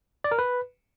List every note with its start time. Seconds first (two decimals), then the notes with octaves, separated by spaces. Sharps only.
0.24 D5
0.32 A#4
0.39 B4